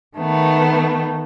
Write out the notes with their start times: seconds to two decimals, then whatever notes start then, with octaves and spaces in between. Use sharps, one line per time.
0.16 D#3 A3 B3